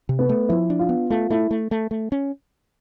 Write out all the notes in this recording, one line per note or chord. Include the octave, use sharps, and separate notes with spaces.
C3
B3
A3
F3 E4
D4
F4
B3
A3 F4
A3 E4
A3
A3
A3
C#4